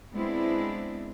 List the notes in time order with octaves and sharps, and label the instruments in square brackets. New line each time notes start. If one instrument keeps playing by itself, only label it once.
[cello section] G#3 B3 C4 D4 E4